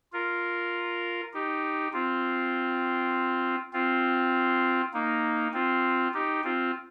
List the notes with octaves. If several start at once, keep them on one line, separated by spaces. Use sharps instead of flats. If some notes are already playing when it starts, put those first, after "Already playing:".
F4 A#4
D#4 G4
C4 F4
C4 F4
A#3 D#4
C4 F4
D#4 G4
C4 F4